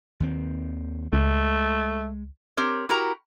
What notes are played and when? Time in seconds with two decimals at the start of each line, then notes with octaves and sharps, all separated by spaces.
0.20 D#2 D#3 C4
1.13 C#2 G#3 A3
2.57 C4 G4 A#4 C#5
2.89 E4 F#4 G4 A#4 A#5